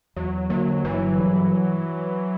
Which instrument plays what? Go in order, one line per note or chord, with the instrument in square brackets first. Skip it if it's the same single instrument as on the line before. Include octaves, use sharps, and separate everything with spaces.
[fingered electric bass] E2 [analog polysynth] F#3
[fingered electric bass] D3 A#3 [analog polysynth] F#3
[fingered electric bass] G1 [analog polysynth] E3
[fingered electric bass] G2 E3 G3